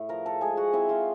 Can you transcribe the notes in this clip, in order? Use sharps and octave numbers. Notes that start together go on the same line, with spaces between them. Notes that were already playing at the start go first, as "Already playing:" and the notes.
Already playing: A2
F3 A#4 A#5
A4 A5
G#3 G#4 G#5
F#4 F#5
C4 E4 E5
F4 F5